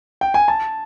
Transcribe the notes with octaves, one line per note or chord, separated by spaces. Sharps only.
G5
G#5
A5